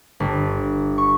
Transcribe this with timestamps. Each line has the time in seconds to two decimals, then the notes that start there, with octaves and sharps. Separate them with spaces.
0.20 G1
0.98 C#6